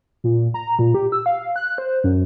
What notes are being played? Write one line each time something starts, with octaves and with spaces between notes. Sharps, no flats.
A#2
A#5
A#2
G4
E6
F5
F#6
C5
F#2